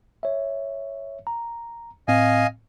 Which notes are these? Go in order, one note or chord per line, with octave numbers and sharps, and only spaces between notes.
C#5 E5
A#5
A2 C4 D#5 F5 G#5